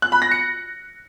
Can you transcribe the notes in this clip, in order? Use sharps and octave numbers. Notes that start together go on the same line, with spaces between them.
F#6
B5
A#6
C#7